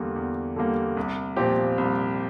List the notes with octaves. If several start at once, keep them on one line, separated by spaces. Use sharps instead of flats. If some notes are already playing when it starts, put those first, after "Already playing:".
Already playing: E2 D3 G3 A#3
E2
D3 G3 A#3
C2
A#2 F3 C4 G4
C2